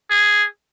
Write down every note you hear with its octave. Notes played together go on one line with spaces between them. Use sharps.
G#4